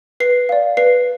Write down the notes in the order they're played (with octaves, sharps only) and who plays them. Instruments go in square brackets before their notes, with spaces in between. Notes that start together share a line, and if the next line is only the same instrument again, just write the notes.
[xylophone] B4 C7
D5 F5
B4 C7